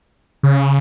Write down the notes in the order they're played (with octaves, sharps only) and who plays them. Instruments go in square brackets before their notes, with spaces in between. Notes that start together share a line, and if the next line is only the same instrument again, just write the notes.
[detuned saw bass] C#3